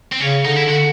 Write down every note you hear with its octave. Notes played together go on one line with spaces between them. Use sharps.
C4
C#3 C#4
D3 D#4
E4
D3 F#4